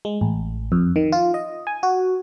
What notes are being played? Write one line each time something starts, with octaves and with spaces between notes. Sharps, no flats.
G#3
A1
F2
D#3
F4
D#5
G#5
F#4